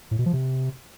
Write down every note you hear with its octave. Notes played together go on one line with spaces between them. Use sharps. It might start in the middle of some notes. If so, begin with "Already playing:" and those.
A2
B2
F3
C3